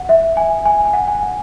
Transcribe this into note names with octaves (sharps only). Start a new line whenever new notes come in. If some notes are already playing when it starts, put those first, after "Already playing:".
Already playing: F#5
E5
G#5
G#5
G#5
F#5
G#5
F#5